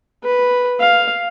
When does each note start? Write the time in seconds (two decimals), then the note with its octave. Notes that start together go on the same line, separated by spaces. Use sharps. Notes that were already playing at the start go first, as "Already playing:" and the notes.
0.24 B4
0.80 F5